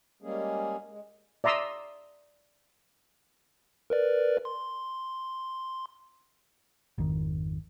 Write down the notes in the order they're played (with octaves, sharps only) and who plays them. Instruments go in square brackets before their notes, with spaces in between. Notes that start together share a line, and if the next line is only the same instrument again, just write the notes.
[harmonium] G3 G#3 A#3 C#4 G#4
G#3
[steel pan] D5 E5 A#5 C6 D#6 E6
[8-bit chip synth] A#4 B4 D5
C6
[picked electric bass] G#1 F2 D#3